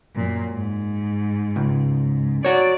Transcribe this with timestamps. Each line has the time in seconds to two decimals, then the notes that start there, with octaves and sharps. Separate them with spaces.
0.15 F#2 A#2
0.52 G#2
1.56 C#2
2.45 F#4 C#5 D5